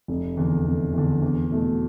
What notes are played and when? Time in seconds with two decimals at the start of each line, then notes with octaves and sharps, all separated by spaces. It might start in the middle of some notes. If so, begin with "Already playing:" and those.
0.08 F1
0.37 E2 D3
0.65 F1
0.94 E2 D3
1.22 E2
1.50 B2 A3